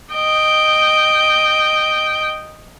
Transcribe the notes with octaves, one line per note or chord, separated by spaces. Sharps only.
D#5 G5